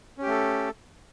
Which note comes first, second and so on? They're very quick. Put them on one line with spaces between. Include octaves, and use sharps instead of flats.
C#4 G4 A3 A4